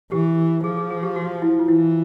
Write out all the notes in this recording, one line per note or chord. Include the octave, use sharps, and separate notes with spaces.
E3 G4
F3 G#4
G#4
G#4
G4
F#4
E4
F4
E3 E4